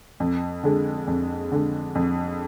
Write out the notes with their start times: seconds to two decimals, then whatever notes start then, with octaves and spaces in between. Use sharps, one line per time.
0.20 F2
0.63 D3 G#3
1.07 F2
1.52 D3 G#3
1.95 F2